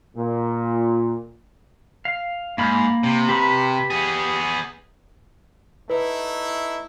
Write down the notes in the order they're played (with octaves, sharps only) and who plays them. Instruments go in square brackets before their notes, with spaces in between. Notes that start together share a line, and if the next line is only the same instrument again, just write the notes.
[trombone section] A#2
[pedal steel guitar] F5
[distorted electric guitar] G#2 [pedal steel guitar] A#3 B5 F6
[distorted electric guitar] C3
[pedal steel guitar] G4 B4 B5
[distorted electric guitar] B3 G#4
[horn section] A3 D#4 E4 [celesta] B4